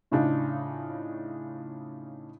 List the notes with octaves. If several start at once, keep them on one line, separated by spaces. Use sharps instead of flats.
A2 C#3 D4 D#4 F4